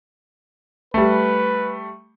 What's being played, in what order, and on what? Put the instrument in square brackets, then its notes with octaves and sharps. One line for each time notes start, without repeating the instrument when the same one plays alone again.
[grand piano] G3 A3 [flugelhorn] B4